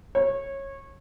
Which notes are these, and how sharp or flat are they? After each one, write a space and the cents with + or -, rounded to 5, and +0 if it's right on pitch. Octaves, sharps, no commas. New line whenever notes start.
C#5 -20